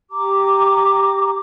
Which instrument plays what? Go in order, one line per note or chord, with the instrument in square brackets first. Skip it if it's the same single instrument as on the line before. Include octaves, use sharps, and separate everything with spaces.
[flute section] G4 A#5 D6